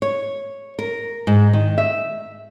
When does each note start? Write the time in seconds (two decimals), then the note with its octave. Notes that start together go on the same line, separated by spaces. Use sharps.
0.02 C#5
0.79 A#4
1.27 G#2
1.53 D#3
1.78 E5